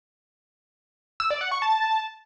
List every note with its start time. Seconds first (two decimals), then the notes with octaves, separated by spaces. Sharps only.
1.20 E6
1.30 D5
1.41 F#5
1.51 C#6
1.62 A5